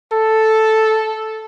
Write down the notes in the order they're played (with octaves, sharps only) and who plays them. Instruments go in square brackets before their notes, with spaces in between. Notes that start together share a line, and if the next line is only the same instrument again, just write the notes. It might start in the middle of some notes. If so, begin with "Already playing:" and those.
[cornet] A4